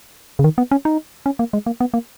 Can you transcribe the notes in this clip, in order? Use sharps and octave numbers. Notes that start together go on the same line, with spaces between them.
C#3
D#3
B3
C#4
D#4
C#4
A#3
G#3
A#3
B3
A#3